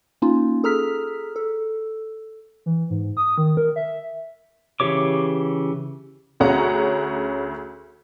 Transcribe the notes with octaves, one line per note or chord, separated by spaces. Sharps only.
A#3 C#4 D#4 F4
G#4 A4 A#5 F6 B6
A4
E3
G#2
D#6
D#3
A#4
E5
C#3 E3 G4 C#5 D6
D2 C#4 G#4 F#5 A#5